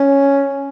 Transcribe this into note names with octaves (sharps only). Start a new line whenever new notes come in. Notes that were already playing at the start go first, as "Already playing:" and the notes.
Already playing: C#4